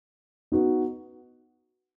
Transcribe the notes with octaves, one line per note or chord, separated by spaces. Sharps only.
B3 D#4 F#4